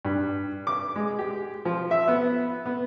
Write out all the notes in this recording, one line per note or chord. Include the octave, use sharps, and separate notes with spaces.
G2
D6
G#3
G4
F3
E5
B3
B3